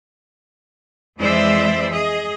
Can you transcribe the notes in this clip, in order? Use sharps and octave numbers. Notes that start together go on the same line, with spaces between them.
F2 E3 G#3 C5 D5 E5
G#4 D#5